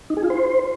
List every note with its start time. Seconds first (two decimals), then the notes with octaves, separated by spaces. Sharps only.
0.10 D#4
0.17 G#4
0.23 F4
0.30 C5